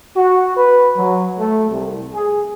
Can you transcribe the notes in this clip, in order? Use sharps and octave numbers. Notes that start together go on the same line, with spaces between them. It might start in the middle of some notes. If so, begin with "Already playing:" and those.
F#4
B4
F#3
A3
C2
G#4